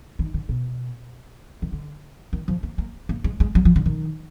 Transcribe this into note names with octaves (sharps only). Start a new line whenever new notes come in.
D#3
D3
B2
D#3
D3
D#3
F3
A#3
A#3
A#3
G#3
G#3
F#3
F3
D3
D#3